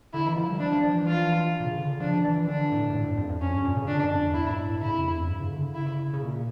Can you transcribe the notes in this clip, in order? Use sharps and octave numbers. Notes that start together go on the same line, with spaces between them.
D3 E4
E3
F3
G3
F3 D4
F3
F3
E3
F4
A#2
C#3
D3
C#3
F3 D4
E3
D3 D4
A2
G2
A2
G2
E2
F2
F2
F2 C#4
G2
A#2
C#3
D3 D4
G2
F2
E2
E4
A2
G2
A2
C#3 E4
F2
E2
F2
G2
C#3
D3
C#3
E4
C#3
A#2